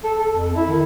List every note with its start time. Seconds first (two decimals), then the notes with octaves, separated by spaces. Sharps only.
0.04 A4
0.21 A4
0.34 F2
0.54 E4
0.69 D#3